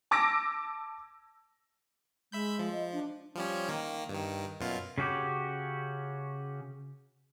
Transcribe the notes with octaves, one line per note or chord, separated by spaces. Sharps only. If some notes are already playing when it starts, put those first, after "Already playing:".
A5 D6 E6 A#6 D7
G#3 E5 B5 G6
F3
D#5
D4
F3 G3 C#4
D#3 A#3
G2 D#3
F#2 B2 F4
C#3 C#4 F#4 G4